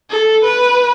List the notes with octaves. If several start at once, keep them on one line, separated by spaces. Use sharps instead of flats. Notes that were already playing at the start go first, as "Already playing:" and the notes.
A4
B4